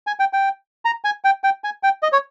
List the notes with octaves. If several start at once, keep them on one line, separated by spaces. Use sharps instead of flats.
G#5
G5
G5
A#5
G#5
G5
G5
G#5
G5
D#5
C#5